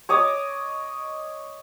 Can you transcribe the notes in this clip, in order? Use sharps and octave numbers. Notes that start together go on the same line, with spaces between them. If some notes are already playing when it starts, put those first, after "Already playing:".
C#5 D#5 D6 D#6